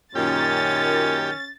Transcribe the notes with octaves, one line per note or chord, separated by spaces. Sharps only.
F#2 A#2 D#3 C#4 G4 A6